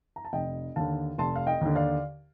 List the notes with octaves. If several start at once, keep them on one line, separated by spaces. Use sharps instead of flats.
A#5
A5
F1 D#5 G5
D#2 D3 F5 A5
F1 A5 C6
F5
D#5 G5
D#2 D3
D5 F5